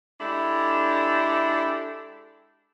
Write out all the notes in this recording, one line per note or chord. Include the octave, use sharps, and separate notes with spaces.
G#3 D4 E4 G4 A4